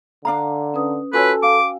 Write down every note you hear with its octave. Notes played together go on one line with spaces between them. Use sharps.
D3 D4 F5 A#5
C#4 B4 D#6
F4 F#4 A4 B4 C#5 G#5 E6
F5 G5 D6